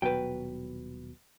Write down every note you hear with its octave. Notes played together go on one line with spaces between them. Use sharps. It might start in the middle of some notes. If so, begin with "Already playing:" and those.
D#1 B2 F#3 B4 G5